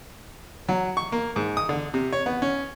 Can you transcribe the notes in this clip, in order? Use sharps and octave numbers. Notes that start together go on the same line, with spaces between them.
F#3
C#6
A#3
G#2
D#6
D3
C3
C#5
B3
C#4